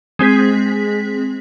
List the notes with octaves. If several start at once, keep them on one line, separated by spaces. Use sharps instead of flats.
G#3 C4 G#4 B6